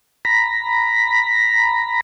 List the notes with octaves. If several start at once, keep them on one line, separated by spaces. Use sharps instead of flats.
A#5 B5